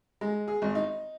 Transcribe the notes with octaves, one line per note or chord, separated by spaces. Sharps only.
G#3
G#4
G#1
D#4